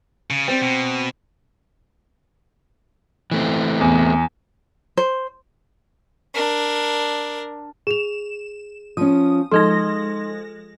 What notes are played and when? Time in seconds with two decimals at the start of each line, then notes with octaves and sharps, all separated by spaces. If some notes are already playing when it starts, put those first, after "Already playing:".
0.30 C#3
0.48 G3 C4
0.62 B2
3.31 E3 A3 C4
3.80 E2
4.97 C5
6.34 D4 A#4
7.87 G#4 E7 F7
8.97 F3 C#4 D#6
9.51 F3 G#3 D#4 A4 D#5 C6 A#6